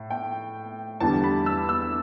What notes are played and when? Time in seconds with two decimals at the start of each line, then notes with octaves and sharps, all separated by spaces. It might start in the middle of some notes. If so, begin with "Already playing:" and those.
Already playing: A2
0.10 G5
1.00 E2 D3 G3 A5
1.24 B5
1.46 E6
1.69 E6